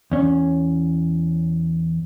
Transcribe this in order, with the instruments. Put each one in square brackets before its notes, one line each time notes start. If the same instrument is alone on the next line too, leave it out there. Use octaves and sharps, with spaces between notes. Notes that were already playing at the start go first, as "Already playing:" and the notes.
[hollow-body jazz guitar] E2 C#4